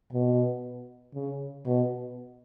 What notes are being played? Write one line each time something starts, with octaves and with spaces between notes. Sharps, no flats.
B2
C#3
B2